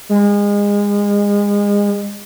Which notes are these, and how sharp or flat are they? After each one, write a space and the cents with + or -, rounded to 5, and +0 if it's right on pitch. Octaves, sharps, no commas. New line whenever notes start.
G#3 -30